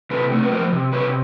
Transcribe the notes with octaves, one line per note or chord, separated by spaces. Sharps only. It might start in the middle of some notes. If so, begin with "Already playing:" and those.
C3 A4 B4
A3
B4
F3 A#4 C5
C3
C3 B4 C#5